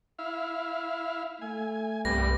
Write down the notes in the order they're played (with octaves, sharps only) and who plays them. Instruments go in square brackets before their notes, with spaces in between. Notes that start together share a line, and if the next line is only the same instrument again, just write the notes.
[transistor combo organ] E4 F5
[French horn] A3 [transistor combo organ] G#5
[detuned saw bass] C2 [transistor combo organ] G2 G3 B3 [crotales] A#6